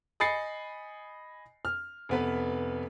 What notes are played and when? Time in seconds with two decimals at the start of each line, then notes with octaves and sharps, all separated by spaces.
0.20 D#5 G#5 B5 A6 C7 C#7
1.65 F6
2.09 F1 B3 B4